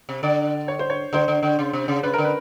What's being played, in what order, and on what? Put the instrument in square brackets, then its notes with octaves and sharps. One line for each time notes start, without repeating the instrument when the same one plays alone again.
[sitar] C3
[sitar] D3 [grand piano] D5
[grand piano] C#5
C5
C#5
[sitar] D3 [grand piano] C5
[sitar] D3
D3
C#3
C3
C#3
[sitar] C#3 [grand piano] B4
[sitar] D3 [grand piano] A#4
[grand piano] B4